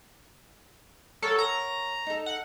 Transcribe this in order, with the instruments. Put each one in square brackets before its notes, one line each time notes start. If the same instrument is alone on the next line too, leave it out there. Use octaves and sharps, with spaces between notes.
[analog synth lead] A4 [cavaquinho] A#4 C#5 F#5
[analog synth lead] A#5
[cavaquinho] D#4 A4
[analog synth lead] F#5